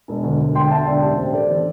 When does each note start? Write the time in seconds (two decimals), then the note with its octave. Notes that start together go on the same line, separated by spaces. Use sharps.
0.08 E1
0.23 D2
0.40 E1
0.55 D3 G5 C6
0.71 E1 E5 A5
0.86 D2 D5 G5
1.02 A1 D4 G4
1.18 A2 G4 C5
1.33 A1 A4 D5
1.49 E3